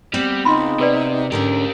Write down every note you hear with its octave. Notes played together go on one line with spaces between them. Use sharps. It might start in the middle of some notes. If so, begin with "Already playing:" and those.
G3 B3 C4
C#2 D#4 B5 C6
C3 G#4 B4 D5
G#2 D3 C#4 G4 A#4